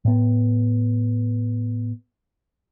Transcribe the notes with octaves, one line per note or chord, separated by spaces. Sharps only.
A2 B3